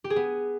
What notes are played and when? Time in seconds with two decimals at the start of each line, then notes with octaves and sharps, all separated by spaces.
0.04 G4
0.10 G#4
0.16 B3